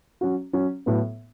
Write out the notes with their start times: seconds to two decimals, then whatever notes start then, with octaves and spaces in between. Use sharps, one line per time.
0.21 F#3 C#4 F#4
0.53 F#3 C#4 F#4
0.86 A2 F#3 B3